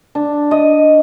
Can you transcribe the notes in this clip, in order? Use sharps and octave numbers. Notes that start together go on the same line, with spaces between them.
D4
D#5